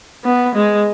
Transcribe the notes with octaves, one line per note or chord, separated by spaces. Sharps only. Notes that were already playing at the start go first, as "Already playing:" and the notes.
B3
G#3